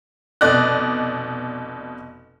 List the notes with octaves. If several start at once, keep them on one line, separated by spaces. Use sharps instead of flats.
F1 B2 D5 D#5 D#6 F#6